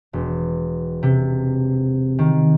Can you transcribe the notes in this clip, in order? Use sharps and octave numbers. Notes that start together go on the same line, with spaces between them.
E1
C3
D#3